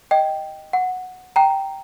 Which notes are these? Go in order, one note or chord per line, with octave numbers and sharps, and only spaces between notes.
D#5 G5
F#5
G5 A#5